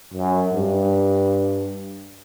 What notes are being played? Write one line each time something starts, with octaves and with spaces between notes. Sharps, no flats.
F#2
G2